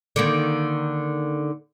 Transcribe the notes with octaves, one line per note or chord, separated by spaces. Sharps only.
D3 D#3 A#3